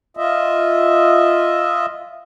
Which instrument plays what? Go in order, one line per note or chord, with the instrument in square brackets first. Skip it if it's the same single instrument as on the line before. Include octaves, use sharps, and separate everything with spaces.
[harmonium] F4 D#5 E5